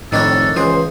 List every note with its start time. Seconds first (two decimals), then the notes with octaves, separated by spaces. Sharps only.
0.12 F1 A2 D#3 D4 A4 C#5
0.56 C#2 E3 G#4 C5